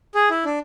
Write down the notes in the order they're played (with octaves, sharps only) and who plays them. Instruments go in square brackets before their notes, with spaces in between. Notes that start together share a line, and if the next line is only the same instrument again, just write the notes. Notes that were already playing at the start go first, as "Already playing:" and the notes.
[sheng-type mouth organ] G#4
E4
D4